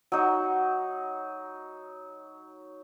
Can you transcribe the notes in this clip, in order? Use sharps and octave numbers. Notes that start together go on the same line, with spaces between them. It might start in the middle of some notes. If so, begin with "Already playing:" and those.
F#3 D#4